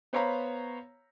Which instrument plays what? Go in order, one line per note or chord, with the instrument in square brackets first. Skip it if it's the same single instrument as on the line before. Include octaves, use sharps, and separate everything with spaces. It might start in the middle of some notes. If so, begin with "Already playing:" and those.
[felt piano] B3 C5 C#5 F5 A#5 B5